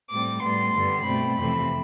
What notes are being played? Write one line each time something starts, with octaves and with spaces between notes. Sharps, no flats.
A2 G3 C4 D6
A2 G3 B3 C6
G2 D3 G3 B3
B2 A3 C4 B5
F2 C3 E3 A3 C4 B5